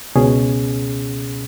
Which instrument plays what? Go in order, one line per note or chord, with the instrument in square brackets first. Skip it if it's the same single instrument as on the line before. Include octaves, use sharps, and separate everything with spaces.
[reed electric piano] C#2 B2 C#4 G#4